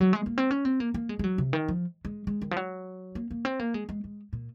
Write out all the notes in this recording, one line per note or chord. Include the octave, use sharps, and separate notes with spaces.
F#3
G#3
A#3
C4
C#4
C4
A#3
A#3
G#3
G#3
F#3
C3
D#3
F3
G#3
G#3
D#3
F3
F#3
A#3
A#3
C4
A#3
G#3
G#3
G#3
A#2